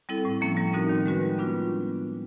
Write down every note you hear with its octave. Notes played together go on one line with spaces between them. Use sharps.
G3 C4 E4 A4
A2
F3 A#3 C#4
G3
C4 D#4 F#4 A#4
D#3
G#3 C#4 F#4 B4
G3
B3 D4 F4